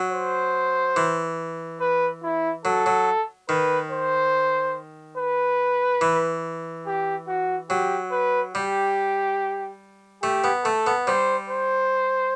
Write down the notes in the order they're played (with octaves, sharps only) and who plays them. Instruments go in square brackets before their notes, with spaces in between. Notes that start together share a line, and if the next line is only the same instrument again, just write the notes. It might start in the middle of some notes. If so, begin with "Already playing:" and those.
Already playing: [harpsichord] F#3
[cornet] C5
[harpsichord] E3
[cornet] B4
E4
[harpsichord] F#3 [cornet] A4
[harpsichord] F#3
[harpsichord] D#3 [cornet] B4
[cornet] C5
B4
[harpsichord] E3
[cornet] G4
F#4
[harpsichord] F#3 [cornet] G4
[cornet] B4
[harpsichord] G3 [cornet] G4
[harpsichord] A3 [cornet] G4
[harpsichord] B3
[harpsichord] A3 [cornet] A4
[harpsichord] B3
[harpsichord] G3 [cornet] C5
[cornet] C5